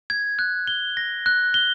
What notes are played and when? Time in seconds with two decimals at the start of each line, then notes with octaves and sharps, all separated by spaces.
0.10 G#6
0.39 F#6
0.67 G7
0.97 A#6
1.26 F#6
1.54 G7